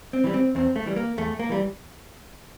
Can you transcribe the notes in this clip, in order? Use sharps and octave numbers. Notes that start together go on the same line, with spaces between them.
C4
E3 G3
C4
E2 C4
A3
E3 G3
A#3
E2 A3
A#3
E3 G3